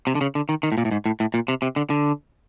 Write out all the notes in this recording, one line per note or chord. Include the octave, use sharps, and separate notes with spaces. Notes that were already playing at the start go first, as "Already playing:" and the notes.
C3
D3
C#3
D3
D#3
D#3
A2
A#2
A2
G#2
A2
A2
A#2
C3
C3
D3
D3